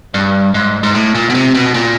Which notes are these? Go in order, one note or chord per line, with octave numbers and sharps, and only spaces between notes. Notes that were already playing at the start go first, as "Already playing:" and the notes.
G2
G#2
G#2
A2
A#2
B2
C3
B2
A#2